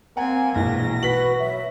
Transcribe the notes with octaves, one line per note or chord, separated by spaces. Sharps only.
A#3 C4 F#5 G#5 A#5
A#1 G#2 B2 E3 A#6
F#4 B4 B6 F#7
F#3 E5